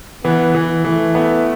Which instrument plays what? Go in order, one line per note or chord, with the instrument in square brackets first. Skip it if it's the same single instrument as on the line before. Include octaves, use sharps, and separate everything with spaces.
[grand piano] E3 [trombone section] B3
[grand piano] E3
[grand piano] E3 [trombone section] A3
[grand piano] B3